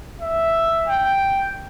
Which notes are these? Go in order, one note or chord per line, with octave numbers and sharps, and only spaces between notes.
E5
G5